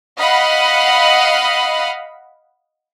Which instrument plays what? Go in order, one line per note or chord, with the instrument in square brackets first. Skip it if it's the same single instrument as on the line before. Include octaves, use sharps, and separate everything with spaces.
[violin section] D#5 F5 F#5 B5